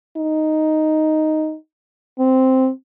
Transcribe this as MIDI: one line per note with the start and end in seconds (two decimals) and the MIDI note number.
0.17 1.55 63
2.19 2.69 60